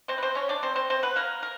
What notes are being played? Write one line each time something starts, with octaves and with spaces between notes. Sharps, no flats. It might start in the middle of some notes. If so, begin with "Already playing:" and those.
C4 C5
B4
C4 C5
C#4 C#5
D4 D5
C4 C5
C4 C5
C4 C5
B3 B4
A#3 A#4
A#4